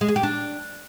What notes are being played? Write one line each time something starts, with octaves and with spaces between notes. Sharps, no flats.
G#3
G#4
G4
D4